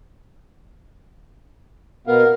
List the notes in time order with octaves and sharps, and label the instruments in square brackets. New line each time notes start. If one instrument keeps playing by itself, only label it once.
[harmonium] B2 B3 F5 [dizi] A#4